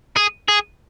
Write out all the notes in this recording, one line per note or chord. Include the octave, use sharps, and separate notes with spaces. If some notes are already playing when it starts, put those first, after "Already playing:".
G#4
G#4